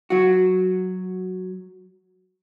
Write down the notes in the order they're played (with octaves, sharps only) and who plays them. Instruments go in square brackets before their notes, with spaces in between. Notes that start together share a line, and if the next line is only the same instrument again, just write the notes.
[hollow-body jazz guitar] F#3 F#4